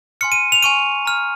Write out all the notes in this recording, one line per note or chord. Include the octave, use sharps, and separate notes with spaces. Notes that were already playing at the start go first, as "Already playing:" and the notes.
G#5 C6 F6 C#7
D#7
F7
G#5 C#6 F6 D#7
A#5 F6